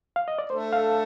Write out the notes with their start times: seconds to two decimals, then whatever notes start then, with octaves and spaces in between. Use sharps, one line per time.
0.16 F5
0.28 D#5
0.38 D5
0.50 A3 D4 A4 C5
0.73 F5